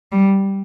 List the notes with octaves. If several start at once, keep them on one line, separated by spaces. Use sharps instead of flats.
G3